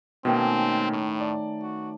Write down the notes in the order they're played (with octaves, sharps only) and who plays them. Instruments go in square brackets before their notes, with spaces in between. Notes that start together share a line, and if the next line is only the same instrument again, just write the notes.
[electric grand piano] B2 A#3 [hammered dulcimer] D#3 A3 C#4 [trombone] C4
[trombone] A2
[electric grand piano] D5
[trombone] F#4